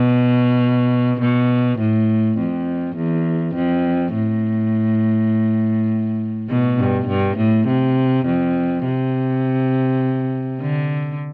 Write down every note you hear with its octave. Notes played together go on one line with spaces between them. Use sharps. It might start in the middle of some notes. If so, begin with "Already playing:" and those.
Already playing: B2
B2
A2
F2
E2
F2
A2
B2
G2
G2
A2
C3
F2
C3
D3